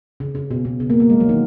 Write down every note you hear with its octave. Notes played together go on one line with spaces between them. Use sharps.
C#3
C#3
B2
B2
C#3
A#3
A#3
G#3
F#3
D#3